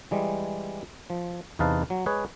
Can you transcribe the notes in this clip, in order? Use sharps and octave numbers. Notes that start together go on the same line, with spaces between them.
E3 G3 G#3
F3
E2 C3 D#4 B4 F5 A5
F#3
G#3 G#4 B4 C#5